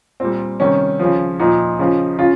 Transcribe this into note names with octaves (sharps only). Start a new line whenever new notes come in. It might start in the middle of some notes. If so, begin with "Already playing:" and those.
A#2 G3 C4
C3 D#3 G3 C#4
C#3 F3
A#2 F3 D#4
C#3 F3
C#3 F4